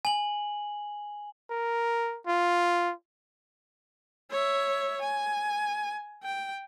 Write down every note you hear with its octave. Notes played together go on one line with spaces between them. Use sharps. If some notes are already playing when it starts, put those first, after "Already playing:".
G#5 F#7
A#4
F4
C#5 E5
G#5
G5